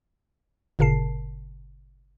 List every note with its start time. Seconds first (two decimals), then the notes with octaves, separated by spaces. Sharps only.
0.79 G1 A#2 C#3 A#4 A5 C7